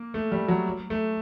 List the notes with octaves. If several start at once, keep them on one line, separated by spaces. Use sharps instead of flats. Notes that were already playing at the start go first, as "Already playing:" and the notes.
Already playing: A#3
A3
G3
F#3
A3